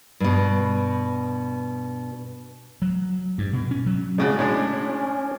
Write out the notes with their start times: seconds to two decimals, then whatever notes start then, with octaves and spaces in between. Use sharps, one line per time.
0.20 G2 B2
2.82 F#3
3.38 G2
3.53 B2
3.71 C#4
3.86 F#3
4.18 A2 C#3 G#3 F#4 D5
4.39 A2 G#3 C#4 D4